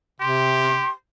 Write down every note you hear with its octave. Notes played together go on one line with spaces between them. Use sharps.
C3 G4 C6